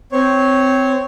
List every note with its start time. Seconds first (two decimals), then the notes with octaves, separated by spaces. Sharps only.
0.12 C4 C#5